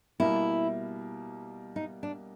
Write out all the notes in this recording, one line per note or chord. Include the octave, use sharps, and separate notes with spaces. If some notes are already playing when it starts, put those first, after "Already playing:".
B2 G3 A#3 E4
D#4
D4